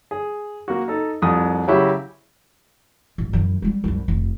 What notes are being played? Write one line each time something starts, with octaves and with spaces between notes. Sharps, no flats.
G#4
A#3 F#4
D#4 A4
C2 F2 D#6
C#3 F#3 E4 F#4 G4
A1
F#2 E3
G3 G#3
C2 F#2
F1